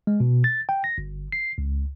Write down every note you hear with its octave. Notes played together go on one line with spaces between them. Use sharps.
G#3
B2
A6
G5
A#6
G1
C7
C#2